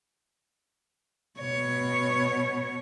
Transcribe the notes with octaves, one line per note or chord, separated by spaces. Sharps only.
B2 C#5